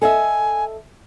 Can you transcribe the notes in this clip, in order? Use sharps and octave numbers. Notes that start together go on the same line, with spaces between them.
A4 D#5 E5 G#5